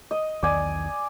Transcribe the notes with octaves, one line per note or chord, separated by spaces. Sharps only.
D#5
B1 E2 D#3 D5 G#5